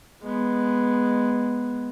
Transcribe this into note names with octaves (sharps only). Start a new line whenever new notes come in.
G#3 B3